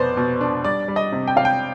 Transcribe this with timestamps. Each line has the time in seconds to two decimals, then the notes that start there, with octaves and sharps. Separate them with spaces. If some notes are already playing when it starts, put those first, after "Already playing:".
Already playing: F1 B2 B3 C5 D5
0.17 B2
0.41 D4
0.64 G3 D5
0.88 G3
0.96 D#5
1.13 C3
1.28 G5
1.36 C3 F5
1.45 G5